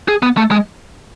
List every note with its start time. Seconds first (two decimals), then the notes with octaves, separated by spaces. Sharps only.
0.08 G#4
0.22 B3
0.37 A3
0.51 G#3